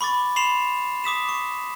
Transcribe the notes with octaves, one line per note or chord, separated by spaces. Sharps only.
B5 C#6 D6 A6
B5 C6 C7 E7 F7
D6 D#6 B6 E7
C#6